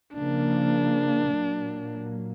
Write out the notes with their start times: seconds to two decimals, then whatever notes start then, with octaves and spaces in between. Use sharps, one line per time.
0.14 C#3 F3 A#3 D4
1.30 A#2 F#3 A#3